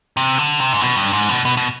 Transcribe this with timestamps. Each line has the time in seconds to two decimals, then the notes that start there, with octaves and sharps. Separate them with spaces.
0.17 C3
0.38 D3
0.60 C3
0.73 G#2
0.81 B2
0.97 G2
1.13 G#2
1.29 B2
1.45 B2
1.57 B2